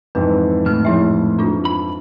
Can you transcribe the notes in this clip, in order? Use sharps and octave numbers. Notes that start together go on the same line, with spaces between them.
F2 G#2 E3 B4
A2 F6
F3 E4 E5
D4 F4
B5